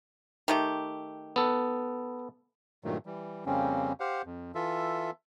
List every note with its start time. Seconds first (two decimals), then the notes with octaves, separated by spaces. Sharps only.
0.48 D#3 A3 G4
1.36 B3 A4
2.84 G2 A#2 D#3 F#3 A3
3.06 E3 G3
3.46 F2 C#3 G3 A#3 C4 C#4
4.00 G4 C5 F5 F#5
4.26 F2
4.55 E3 F4 A4 E5